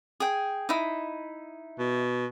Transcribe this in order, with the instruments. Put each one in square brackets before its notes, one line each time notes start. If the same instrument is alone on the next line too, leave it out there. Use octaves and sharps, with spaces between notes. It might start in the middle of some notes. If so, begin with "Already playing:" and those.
[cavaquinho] G#4 G5
D#4 E4
[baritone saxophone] B2